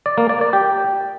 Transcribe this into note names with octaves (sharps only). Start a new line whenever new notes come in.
D5
A#3
D5
D5
G4